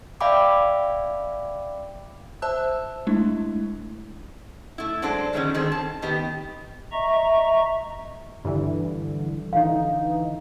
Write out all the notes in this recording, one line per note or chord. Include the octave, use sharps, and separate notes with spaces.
D5 E5 F5 G5 B5 D6
C5 E5 A5 E6 F#6
G#3 A3 D4 E4
A3 E4
F#3 G#3 D4 A4 C5
D3 D#3 G#3 C4 C#4
D3 D#3 C4 G#4 C5
A5
D#3 B3 G4
D#5 E5 A#5 C#6
G2 D3 E3
D3 E3 D#4 F5